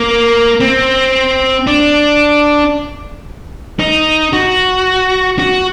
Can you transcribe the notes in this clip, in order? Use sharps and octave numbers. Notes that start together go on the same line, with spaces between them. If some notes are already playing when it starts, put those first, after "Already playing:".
Already playing: A#3
C4
D4
D#4
F#4
F#4